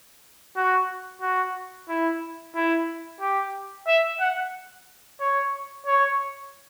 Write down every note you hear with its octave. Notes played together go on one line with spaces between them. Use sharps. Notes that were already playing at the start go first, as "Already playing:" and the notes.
F#4
F#4
E4
E4
G4
E5
F#5
C#5
C#5